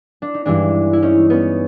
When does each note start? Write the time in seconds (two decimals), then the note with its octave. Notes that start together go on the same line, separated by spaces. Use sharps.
0.22 D4
0.34 D#4
0.46 G2 E3 G#3 D4 E4
0.93 E4
1.02 C#4 D#4
1.30 B3 C#4